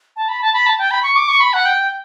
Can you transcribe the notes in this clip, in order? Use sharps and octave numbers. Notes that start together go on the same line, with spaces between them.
A5
B5
A5
B5
A5
G5
B5
C#6
D6
C#6
B5
F#5
G5